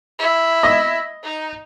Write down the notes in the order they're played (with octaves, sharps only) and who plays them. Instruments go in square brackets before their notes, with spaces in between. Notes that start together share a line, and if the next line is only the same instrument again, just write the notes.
[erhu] E4
[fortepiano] D#5
[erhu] D#4